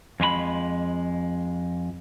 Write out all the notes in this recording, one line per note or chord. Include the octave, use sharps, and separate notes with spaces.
F2 G#3 F4 B5